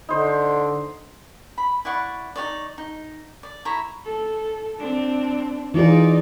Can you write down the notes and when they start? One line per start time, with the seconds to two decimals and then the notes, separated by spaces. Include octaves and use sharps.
0.09 D3 D#4 C5
1.58 B5
1.85 E4 D5 F#5 C#6
2.36 D#4 F#4 C#5 D5
2.78 D#4
3.43 D5
3.65 E4 E5 A#5 C#6
4.06 A4
4.79 C4 D4
5.74 E3 D#4 F4 G#4 D5